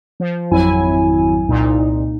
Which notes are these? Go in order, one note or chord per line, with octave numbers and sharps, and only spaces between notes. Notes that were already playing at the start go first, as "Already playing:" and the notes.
F3
G#1 F2 F#3 E4 G#5
C2 A#2 D#4